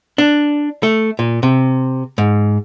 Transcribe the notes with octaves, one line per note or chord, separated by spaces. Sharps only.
D4
A3
A#2
C3
G#2